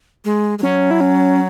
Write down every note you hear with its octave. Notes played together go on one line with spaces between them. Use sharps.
G#3
G#3
F#3 C#4
E4
C#4